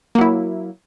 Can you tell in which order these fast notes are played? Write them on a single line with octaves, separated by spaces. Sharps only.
A#3 F#3 E4